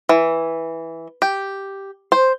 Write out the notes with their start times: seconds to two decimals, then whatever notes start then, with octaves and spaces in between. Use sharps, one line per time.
0.09 E3
1.22 G4
2.12 C5